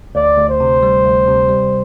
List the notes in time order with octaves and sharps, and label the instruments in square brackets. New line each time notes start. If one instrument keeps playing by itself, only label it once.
[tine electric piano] D2 [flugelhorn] D5
[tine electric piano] D2
[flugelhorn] C5
[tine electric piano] C3
G3
D2
C3
G3